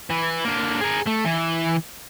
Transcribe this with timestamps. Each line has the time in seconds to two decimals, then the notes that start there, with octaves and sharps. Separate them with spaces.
0.10 E3
0.45 D3 A#3
0.81 G#4 A#4
1.07 A3
1.25 E3